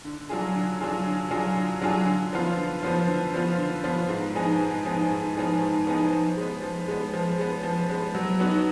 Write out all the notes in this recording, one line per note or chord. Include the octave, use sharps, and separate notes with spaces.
D3
F#3 D4 F4 G#4
D3
F#3 D4 F4 G#4
D3
F#3 D4 F4 G#4
D3
F#3 D4 F4 G#4
D3
F3 B3 F4
D3
F3 B3 F4
D3
F3 B3 F4
D3
F3 B3 F4
G#2
F3 B3 D#4 G#4
G#2
F3 B3 D#4 G#4
G#2
F3 B3 D#4 G#4
G#2
F3 B3 D#4 G#4
F3
G#3 B3
F3
G#3 B3
F3
G#3 B3
F3
G#3 B3
F#3
B3 D#4 F#4